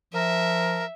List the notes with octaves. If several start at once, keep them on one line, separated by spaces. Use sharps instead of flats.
F3 A#4 E5